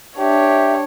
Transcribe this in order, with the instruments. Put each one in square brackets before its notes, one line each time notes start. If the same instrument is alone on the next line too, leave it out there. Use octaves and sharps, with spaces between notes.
[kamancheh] D4 C#5 [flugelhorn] G4 [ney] E5